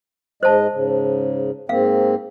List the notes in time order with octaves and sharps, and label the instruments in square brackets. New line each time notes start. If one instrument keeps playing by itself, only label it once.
[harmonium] G#2 G#3 D#5 [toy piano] C5 A5
[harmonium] G#2 C#3
[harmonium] G#2 A#3 C4 [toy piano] F5